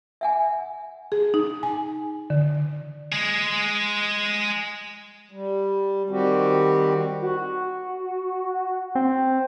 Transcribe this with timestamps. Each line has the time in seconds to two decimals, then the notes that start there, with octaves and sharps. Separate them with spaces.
0.21 E5 F#5 G#5
1.12 G#4
1.34 D#4
1.63 G#5
2.30 D3
3.12 G#3 G#4
5.32 G3
6.10 D#3 G3 C4 F#4 G4
7.22 F#4
8.95 C4